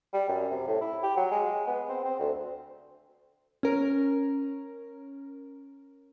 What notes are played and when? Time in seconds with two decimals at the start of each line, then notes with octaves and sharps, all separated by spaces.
0.14 G3
0.28 F#2
0.51 C3
0.67 A2
0.81 E4
1.03 G4
1.17 F#3
1.31 G#3
1.67 B3
1.89 C4
2.05 C4
2.19 D2
3.63 C#4 A#4